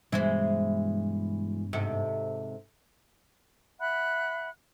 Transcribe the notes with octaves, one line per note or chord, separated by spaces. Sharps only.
G2 B2 E3 G3 G#3 C5
G#2 C3 A4
E5 F#5 B5 F#6